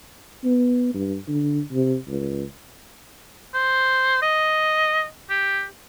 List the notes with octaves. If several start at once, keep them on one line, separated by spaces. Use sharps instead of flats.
B3
G2
D3
C3
C#2
C5
D#5
G4